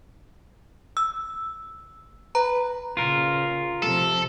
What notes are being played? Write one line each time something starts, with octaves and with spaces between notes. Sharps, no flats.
E6
B4 A#5
C#3 F4 A#4
C3 F3 A4